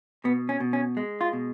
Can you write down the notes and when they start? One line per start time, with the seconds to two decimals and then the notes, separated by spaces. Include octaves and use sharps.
0.24 B2 B3
0.49 C#4
0.60 B2
0.73 C#4
0.97 G#3
1.21 F4
1.33 B2